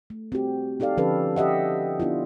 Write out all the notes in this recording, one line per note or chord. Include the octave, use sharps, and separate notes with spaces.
A3
C4 F#4 G4
D#4 G4 A4 D5 F5
D3 F3 C#4 G4 A4 B4
G4 D#5 E5 F#5
B3 D4 E4 F4